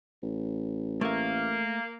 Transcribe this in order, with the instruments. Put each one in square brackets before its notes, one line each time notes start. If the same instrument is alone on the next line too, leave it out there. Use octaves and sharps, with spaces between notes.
[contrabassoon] A1
[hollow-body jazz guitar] A3 E5 [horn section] A#3